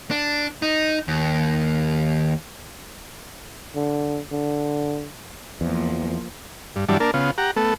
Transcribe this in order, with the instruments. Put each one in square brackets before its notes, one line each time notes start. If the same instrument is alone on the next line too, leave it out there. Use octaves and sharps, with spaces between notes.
[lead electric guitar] D4
D#4
D#2
[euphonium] D3
D3
[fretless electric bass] E2 [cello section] F3 A#3
[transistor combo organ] G2
G2 E3 F#3 G3 D4 A5
A#3 D4 A#4 A5
C#3 B3 F4
G4 F#5 A#5
A3 B3 A4